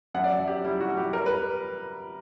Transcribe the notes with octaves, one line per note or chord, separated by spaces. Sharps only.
F#2 F#5
D5
E5
F#2
G4
G3 E4
F#4
G3
G4
G3 A#4
B4